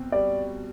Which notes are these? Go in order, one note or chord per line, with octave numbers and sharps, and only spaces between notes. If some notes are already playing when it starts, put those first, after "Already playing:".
Already playing: B2 C4
G3 D5